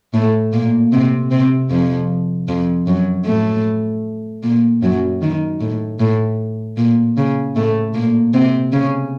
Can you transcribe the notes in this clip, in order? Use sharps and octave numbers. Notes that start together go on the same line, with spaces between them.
A2 A3
A#2 A#3
C3 C4
C3 C4
F2 F3
F2 F3
F#2 F#3
A2 A3
A#2 A#3
F#2 F#3
D#3
A2
A2
A#2
C#3
A2 A3
A#2 A#3
C3 C4
C#3 C#4